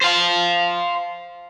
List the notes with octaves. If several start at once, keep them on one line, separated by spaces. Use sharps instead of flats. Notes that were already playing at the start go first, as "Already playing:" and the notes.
C5 F5